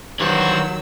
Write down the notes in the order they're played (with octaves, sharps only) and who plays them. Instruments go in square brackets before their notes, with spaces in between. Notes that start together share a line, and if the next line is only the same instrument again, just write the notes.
[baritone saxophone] G2 [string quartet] D#3 F#3 E6 [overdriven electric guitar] E3 F#4 [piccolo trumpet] C5